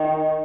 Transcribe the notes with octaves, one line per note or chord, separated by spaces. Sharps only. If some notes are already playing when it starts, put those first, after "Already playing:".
Already playing: D#3